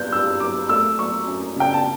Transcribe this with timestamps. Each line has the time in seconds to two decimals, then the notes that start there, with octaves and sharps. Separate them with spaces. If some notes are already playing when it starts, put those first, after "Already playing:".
Already playing: G2 B3 F#6 G6
0.12 G2 E6
0.40 F#3 D6
0.69 A3 E6
0.98 F#3 C#6
1.27 F#2
1.56 C#3 G5
1.73 A5